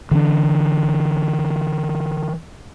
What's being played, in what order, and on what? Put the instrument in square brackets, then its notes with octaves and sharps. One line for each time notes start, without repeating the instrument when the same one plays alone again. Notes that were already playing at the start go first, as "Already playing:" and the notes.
[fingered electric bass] D3 E3 D4